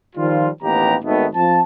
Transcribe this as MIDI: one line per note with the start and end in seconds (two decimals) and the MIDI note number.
0.16 0.49 51
0.16 0.49 53
0.16 0.49 55
0.16 0.49 65
0.63 0.96 33
0.63 0.96 39
0.63 0.96 59
0.63 0.96 67
0.63 0.96 82
1.04 1.26 32
1.04 1.26 51
1.04 1.26 57
1.04 1.26 59
1.35 1.60 41
1.35 1.60 53
1.35 1.60 81